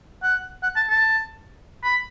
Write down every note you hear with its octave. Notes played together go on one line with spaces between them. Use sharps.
F#5
F#5
A5
A5
B5